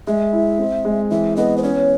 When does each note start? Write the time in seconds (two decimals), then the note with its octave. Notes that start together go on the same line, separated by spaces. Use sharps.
0.07 G#3 E5
0.33 E4
0.59 C4
0.85 G#3
1.10 E3 E5
1.36 B3 D#5
1.58 C5
1.63 C#4 C#5